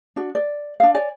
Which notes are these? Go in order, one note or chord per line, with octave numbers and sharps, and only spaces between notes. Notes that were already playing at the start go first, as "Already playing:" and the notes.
D4 F#4
D5
D4 F5
C#5 D5 G#5